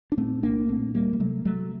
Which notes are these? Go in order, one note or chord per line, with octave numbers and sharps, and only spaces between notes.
D4
A#2 A3 C4
C2 A#3 D4
A#2 A3 C4
D2 G3 A#3
G3
C3 F#3 A3
C3 F#3 A3